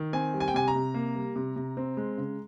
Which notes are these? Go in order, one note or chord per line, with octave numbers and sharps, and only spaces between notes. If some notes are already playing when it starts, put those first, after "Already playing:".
Already playing: D#3
C4 G#5
G3
G#5
G5
C3 G#5
A#5
C3
A#3
G3
C3
C3
C4
G#3
C#3